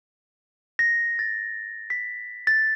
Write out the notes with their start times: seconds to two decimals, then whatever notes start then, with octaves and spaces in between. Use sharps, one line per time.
0.79 A#6
1.19 A6
1.90 B6
2.47 A6